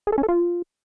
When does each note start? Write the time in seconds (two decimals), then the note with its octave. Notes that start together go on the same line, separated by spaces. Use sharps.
0.07 G#4
0.12 A4
0.18 C#4
0.23 A4
0.29 F4